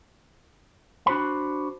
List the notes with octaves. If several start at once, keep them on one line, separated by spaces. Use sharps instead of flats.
D4 F#4 C5 B5